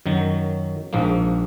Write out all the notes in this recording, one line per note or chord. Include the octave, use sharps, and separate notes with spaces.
F#2 D#3 F#3
A#1 G#2 F3 A#3